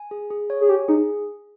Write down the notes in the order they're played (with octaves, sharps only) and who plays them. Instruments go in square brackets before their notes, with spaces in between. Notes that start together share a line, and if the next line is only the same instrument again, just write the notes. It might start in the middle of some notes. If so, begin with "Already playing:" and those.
Already playing: [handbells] G#5
G#4
G#4
C#5
[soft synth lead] G#4
[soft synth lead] G4 [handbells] G#5
[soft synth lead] D#4 [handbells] G#4